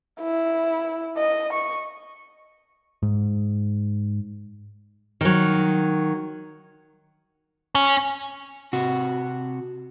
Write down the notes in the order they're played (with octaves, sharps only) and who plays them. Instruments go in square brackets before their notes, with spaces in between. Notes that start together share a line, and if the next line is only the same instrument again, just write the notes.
[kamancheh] E4
D#5
C#6
[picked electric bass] G#2
[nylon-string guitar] D#3 F#3
[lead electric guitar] C#4
[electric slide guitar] C3 F#4